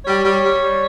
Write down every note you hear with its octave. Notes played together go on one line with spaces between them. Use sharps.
G3 C#5
G3
G3
G3